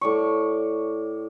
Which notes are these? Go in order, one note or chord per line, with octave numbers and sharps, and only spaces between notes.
A2 D5 C#6